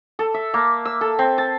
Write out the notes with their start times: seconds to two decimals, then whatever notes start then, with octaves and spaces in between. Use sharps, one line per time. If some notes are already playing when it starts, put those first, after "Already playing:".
0.19 A4
0.34 E5
0.54 A#3
0.85 E6
1.01 A4
1.19 C4
1.38 A5